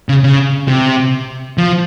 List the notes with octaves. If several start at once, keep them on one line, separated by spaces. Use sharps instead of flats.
C#3
C#3
C3
F3